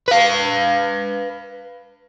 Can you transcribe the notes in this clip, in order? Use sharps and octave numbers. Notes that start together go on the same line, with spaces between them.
B4 F5